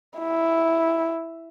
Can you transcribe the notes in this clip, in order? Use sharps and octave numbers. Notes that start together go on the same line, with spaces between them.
E4